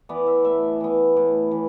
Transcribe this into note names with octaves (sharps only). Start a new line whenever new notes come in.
E3 B3 D5
E5
A2 E5
E3 B3
A2
E3